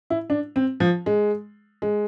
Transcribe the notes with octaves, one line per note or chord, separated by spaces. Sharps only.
E4
D4
C4
F3
G#3
G#3